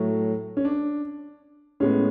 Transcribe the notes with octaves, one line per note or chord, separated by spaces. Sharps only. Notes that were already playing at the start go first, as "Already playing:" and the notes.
Already playing: A2 F#3 A3
C#4
D4
A2 G#3 B3 C#4